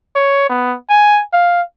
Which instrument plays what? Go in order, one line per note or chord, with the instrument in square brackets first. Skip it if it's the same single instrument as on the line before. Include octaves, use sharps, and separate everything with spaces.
[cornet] C#5
B3
G#5
F5